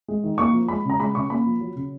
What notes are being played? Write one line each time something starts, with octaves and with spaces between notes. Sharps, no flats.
G#3
D#3
A#3 C#6
F3
G#3 B5
C#3 A#5
G#3 B5
C#3 C#6
A#3 B5
F3
F#3
C#3